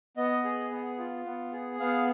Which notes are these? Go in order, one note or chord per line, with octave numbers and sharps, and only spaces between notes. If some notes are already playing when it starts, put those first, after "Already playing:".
B3 D#5
G#4
B3
F4
B3
G#4
B3 F5